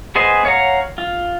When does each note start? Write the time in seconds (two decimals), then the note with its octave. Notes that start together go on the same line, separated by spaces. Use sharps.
0.15 B3 G#4 C5 D#5 G#5
0.45 C#5 F5 F#5 A#5
0.98 F4